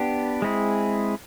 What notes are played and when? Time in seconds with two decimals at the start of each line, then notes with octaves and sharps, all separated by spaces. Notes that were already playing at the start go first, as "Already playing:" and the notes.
Already playing: B3 D4 G4
0.42 G#3 C4 E4 G#4